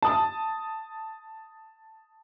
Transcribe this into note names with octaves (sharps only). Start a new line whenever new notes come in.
A5 D#6